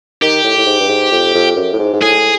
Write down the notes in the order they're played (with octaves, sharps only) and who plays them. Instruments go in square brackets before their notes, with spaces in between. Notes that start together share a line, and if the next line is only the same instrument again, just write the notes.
[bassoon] D#3 [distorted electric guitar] G4
[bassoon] A2
A2
G#2
G2
G#2
F2
F2
F#2
A2
G#2
G#2
[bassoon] A2 [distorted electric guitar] G#4